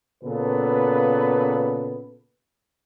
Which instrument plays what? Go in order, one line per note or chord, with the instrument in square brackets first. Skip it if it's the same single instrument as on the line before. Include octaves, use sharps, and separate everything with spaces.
[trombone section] A#2 C#3 B3 A4 B4